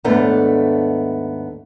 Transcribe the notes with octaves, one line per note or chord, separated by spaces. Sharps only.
D#2 G#2 A3 B3 D4 A#5